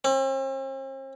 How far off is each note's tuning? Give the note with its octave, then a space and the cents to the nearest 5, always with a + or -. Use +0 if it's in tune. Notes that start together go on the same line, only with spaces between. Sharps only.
C4 +45